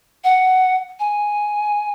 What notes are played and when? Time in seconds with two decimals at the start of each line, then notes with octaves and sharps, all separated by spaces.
0.24 F#5
1.00 G#5